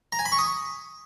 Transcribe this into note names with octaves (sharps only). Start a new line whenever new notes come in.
A#5
G#5
B5
C#6
D#6